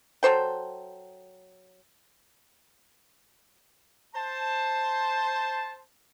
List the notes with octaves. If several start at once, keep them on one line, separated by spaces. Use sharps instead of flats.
F#3 A4 C5 G5
C5 A5